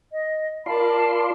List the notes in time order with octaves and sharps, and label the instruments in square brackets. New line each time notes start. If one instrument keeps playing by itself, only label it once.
[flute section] D#5
[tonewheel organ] F4 D5 C6 [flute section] A#4 A5 B5